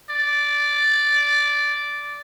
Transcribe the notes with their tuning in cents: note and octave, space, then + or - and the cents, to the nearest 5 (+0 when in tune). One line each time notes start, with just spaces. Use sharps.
D5 -10